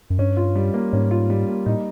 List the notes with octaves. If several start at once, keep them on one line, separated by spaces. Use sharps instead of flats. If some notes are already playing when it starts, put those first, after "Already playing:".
F#2
G2 C#4
F4
G3
A#3
G#2 C#4
F4
G3
A#3
A2 D#4